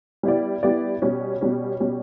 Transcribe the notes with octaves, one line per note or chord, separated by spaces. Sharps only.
G3 B3 E4 G4 D5
G3 B3 E4 G4 D5
B2 G3 C#4
B2 G3 C#4
B2 G3 C#4